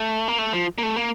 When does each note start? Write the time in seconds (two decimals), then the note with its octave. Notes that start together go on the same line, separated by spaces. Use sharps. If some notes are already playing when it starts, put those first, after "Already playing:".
Already playing: A3
0.28 A#3
0.39 A3
0.53 F3
0.78 A#3
0.83 A3
0.96 A#3